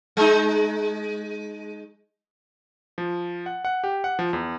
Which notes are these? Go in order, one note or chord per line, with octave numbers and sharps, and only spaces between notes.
G#3 D#4
F3
F#5
F#5
G4
F#5
F3
E2